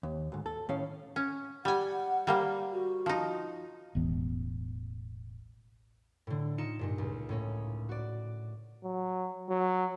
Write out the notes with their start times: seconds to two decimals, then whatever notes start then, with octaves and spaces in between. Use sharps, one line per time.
0.03 D#2
0.32 D2 G#2
0.46 A4
0.69 A2 D#3 C#4 F5
1.16 C#4
1.65 G3 F#5 G#5
2.27 G3 A#3 C5
2.72 F#4
3.06 F3 D#4
3.95 E1 A1 E3 B3
6.27 A2 D3
6.58 D#4 F4 C#7 E7
6.79 G2 A#2 D#4
6.98 C#2
7.29 A2 C#4 D#4
7.89 F#4 D5
8.84 F#3
9.49 F#3